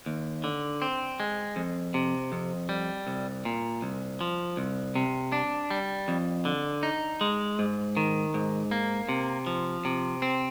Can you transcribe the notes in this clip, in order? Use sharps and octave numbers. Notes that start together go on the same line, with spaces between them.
D#2
D3
C4
G#3
F2
C3
F2
G3
C2
A#2
C2
F3
C2
C3
D4
G3
F2
D3
D#4
G#3
G#2
D#3
G#2
A#3
C3
F3
C3
C4